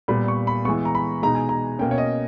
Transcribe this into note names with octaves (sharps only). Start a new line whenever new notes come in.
A#2 G3 B3 B5
C#6
B5
E3 G#3 B3 C#6
A#5
B5
B2 G#3 B3 D#4 A#5
G#5
A#5
B2 A#3 C#4 G5
C#5
D#5